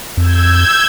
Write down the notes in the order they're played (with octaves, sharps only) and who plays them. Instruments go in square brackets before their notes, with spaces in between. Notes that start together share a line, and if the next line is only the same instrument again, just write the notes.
[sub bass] F2 [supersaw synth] E6 G6 G#6